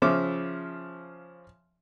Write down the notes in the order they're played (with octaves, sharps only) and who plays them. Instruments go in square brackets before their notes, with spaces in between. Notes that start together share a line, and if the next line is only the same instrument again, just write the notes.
[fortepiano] C#3 F3 E5 D6